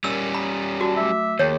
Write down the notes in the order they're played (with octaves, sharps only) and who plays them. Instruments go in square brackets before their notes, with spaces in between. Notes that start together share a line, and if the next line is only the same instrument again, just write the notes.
[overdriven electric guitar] G3 C#4 [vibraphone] A#4 [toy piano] E6
[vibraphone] C#5 A#5 D#6 [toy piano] B5
[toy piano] F#4 [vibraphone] D5 A5 B5
[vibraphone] F#3 A3 D6 [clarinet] E5
[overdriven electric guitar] D#2 [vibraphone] G#4 A#4 [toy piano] C#5